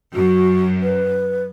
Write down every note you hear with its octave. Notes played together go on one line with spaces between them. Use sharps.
F#2 F#4
B4